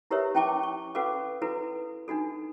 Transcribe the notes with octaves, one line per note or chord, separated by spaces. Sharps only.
E4 G4 A#4 B4 C#5 E5
C#4 E4 G5 A5 C#6 D6
C#6
C#4 F#4 A4 B4 F5 D6
E4 F#4 A4 B4
D4 D#4 F#4 A4